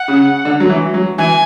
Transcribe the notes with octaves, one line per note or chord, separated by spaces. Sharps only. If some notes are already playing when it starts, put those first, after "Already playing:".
Already playing: F#5
C#3
D3
F#3
E3
F#3
E3 G#5